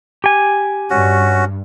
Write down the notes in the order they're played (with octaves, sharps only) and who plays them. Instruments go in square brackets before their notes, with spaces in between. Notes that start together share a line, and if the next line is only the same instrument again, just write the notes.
[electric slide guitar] G4 G#5
[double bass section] G2 [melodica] C#4 F#4